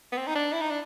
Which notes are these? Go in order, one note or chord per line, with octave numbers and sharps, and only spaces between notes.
B3
C4
D#4
D4
E4
D#4
D4